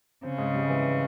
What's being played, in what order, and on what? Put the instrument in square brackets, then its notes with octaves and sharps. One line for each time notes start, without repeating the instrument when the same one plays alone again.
[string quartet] C#3 [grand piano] C4
[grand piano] G#2
G3
E3